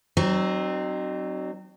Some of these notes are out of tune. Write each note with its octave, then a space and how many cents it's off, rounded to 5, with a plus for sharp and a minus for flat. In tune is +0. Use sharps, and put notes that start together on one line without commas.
F#3 +25 C4 +0 D#4 -35